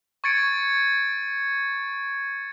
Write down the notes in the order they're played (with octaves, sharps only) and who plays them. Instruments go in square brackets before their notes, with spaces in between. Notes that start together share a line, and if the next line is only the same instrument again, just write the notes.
[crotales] C#6 G#6 A6 C#7 D7